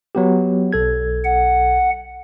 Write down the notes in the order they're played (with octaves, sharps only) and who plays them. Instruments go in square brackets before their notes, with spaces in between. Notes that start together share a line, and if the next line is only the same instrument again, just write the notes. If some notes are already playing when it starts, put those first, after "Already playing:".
[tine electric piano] F#3 B3 G4
B1 A4 G#6
[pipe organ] F#5